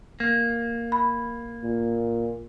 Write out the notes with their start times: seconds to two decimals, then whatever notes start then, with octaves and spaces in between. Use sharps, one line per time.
0.20 A#3
0.92 B5
1.63 A#2